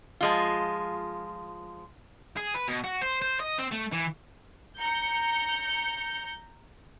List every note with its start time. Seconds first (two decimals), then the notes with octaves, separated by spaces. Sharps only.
0.21 F3 G#3 F4
2.37 G#4
2.55 B4
2.68 B2
2.84 F#4
3.02 C5
3.22 C5
3.40 D#5
3.59 C4
3.72 A3
3.93 E3
4.79 A#5 G6 C#7